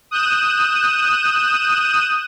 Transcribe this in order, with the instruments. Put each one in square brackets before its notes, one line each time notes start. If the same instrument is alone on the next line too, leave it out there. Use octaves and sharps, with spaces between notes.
[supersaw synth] D#6 F#6 G6 D#7 E7